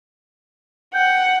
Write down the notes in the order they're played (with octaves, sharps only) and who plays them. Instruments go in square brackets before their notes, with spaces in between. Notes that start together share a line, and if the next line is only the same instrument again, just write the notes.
[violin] F#5 [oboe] G5